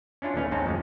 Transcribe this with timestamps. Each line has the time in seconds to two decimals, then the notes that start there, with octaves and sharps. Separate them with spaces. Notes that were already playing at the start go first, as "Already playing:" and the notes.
0.22 C#4 D4 E4 F4
0.36 D#2 A3 C#4 B4 F5
0.51 D#2 G#2 C4 C#4 D#4 A5
0.66 F2 A2 G#3 C#4